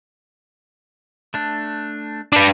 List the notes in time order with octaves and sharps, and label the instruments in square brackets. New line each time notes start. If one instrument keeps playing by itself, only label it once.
[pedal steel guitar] A3 D4
[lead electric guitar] D4 B4 [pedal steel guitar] A5 D6